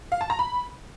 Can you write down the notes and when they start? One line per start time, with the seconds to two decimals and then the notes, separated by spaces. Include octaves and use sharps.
0.12 F5
0.21 A5
0.30 A#5
0.39 B5